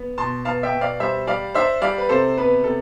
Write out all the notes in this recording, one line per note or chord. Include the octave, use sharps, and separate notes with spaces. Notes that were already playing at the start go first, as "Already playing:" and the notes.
Already playing: B3
B2 A5 C6
B3 F5 A5
E5 G5
B2
D5 F5
G3 C5 E5
G3 D5 F5
D4 C5 E5
G3 D5 F5
B4
C3 A4 C5
B3 B4
C3 A4